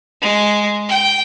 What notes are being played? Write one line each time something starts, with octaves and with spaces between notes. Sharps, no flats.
G#3
G5